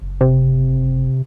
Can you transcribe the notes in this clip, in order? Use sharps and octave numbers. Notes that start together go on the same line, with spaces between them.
F#1
C3